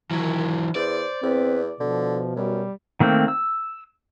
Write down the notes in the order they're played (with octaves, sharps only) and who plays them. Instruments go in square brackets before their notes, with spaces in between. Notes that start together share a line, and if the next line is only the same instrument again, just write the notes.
[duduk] D#3 [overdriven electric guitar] E3 F#3
[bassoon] E2 [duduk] C5 [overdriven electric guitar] D5
[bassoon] E2 [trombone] C4 [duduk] B4
[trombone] B2 [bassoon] D3 [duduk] F3
[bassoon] F#2 [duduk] G3
[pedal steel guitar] D#3 A3 A#3 C4
E6